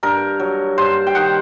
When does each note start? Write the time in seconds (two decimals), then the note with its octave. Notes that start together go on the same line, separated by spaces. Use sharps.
0.03 G2 A#4
0.40 F#3
0.78 G2 C5
1.07 G5
1.15 D#3 F#5